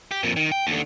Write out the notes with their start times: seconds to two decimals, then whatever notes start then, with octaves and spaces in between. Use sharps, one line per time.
0.11 G4
0.23 F2 A#2
0.36 D#3
0.52 G5
0.67 D#2 D3